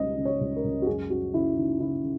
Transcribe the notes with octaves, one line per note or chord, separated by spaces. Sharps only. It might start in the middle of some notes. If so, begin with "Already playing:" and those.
Already playing: C#2 C#3 D#5
C#3
C#5
C#2
A#4
C#2
F#4
F#2 G#4
F#2 F#4
C#3 E4
C#3 D#4
C#3 E4
C#3